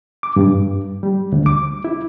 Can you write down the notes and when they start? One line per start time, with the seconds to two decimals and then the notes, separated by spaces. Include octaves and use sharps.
0.23 D6
0.36 G2
1.03 G3
1.32 D2
1.46 D6
1.85 E4